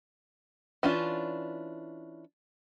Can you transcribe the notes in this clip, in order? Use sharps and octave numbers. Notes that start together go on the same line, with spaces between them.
E3 C#4 D4 F4